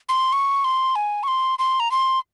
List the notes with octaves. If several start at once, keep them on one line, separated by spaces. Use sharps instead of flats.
C6
C#6
C6
G#5
C#6
C6
C6
A#5
C6